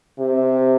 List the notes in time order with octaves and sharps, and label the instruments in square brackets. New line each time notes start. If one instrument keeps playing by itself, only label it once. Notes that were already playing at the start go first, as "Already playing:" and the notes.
[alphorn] C3